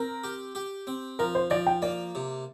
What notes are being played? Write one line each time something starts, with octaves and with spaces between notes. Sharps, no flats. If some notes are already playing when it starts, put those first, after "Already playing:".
Already playing: C4 A#4
G4
G4
C4
F3 A#4
C5
F3 D5
G5
A#3 D5
C3